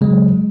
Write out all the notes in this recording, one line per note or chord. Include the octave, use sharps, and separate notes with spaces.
C#3 F#3 G#3